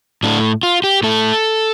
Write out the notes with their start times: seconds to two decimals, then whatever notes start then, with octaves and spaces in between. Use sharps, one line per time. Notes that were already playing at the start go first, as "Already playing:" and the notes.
0.23 A2 A3 D4
0.63 F4
0.84 G4
1.03 A2 A3 A4